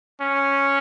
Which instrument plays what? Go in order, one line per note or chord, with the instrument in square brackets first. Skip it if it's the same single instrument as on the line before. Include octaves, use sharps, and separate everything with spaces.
[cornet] C#4